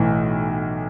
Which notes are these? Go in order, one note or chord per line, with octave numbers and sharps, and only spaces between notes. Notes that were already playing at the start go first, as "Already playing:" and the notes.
Already playing: B1 A2 E3